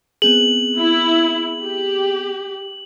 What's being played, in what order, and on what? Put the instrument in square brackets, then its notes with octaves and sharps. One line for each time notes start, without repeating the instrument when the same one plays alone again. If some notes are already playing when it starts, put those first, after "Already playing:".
[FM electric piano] B3 C4 G#4 [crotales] F#7
[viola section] E4
G4